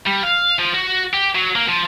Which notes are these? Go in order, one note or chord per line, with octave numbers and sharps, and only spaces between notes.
G3
F5
F3
F#4
G4
F#3
A#3
F3